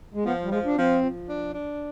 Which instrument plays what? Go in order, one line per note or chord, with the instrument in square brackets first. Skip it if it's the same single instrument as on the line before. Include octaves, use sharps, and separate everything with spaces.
[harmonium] G#3
[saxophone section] F3 [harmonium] B3
[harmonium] G3
[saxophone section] F3 [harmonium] G#3
[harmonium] D4
[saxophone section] F3 [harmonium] C4
[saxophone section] F3
D4
D4